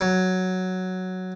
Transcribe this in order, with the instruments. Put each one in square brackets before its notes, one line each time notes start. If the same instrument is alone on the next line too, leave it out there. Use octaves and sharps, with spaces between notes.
[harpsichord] F#3